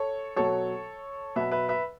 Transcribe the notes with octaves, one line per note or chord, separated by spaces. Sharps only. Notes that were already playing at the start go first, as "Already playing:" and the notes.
Already playing: A4 C#5
B2 F#3 A4 C#5
B2 F#3 B4 E5
B4 E5
B4 E5